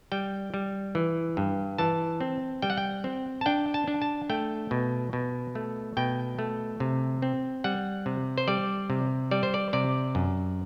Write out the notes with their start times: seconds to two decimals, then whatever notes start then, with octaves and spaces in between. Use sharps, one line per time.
0.12 G3 G5
0.54 G3
0.95 E3
1.37 G2
1.78 E3 A5
2.21 C4
2.62 G3 G5
2.70 F#5
2.77 G5
3.04 C4
3.41 A5
3.46 D4 G5
3.74 A5
3.88 D4
4.02 A5
4.30 A3 G5
4.71 B2
5.13 B2
5.55 A3
5.97 B2 G5
6.39 A3
6.80 C3
7.22 C4
7.64 G3 F#5
8.06 C3
8.38 C5
8.48 G3 D5
8.90 C3
9.31 G3 D5
9.43 C5
9.54 D5
9.73 C3 D5
10.15 F#2